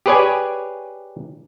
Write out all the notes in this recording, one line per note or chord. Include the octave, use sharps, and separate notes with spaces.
G4 G#4 B4 C#5 D5 G#5